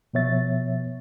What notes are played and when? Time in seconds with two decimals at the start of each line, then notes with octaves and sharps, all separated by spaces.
0.14 B2 F3 B3 C#5 E5 A6